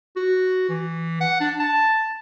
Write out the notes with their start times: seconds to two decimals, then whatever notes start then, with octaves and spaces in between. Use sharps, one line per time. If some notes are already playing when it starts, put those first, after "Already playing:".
0.16 F#4
0.69 E3
1.21 F#5
1.41 D4
1.60 A5